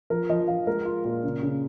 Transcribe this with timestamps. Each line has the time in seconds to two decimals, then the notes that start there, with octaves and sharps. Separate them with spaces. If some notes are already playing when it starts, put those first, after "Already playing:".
0.10 F3 A#4
0.30 F3 D#5
0.48 F3 F5
0.67 G#3 A#4
0.85 F4
1.05 A#2
1.23 C#3
1.43 C#3